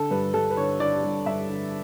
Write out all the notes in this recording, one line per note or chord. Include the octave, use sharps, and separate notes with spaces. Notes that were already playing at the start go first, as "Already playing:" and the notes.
Already playing: D3 A4
G2 B4
G2 A4
B4
D3 C#5
D3 D5
G2
G2 E5
D3